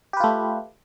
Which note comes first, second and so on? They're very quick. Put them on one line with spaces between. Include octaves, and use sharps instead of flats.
G4 B4 F4 A3